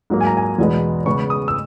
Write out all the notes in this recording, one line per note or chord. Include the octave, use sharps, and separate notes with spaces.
G#2 F#3 A#3
G#5
A#5
G#5
A#5
E2 B2 G#3 B3
C#3 G#3 B3 C#6
D#6
E6